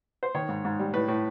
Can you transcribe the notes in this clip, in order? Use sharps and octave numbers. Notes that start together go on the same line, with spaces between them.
C5
D#3 C#5
G#2
G#2
G3
A2 B4
A2